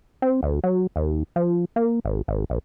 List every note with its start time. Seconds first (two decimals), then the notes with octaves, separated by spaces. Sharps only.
0.22 C4
0.43 D2
0.64 F#3
0.96 D#2
1.36 F3
1.76 A#3
2.05 G#1
2.28 G#1
2.50 A#1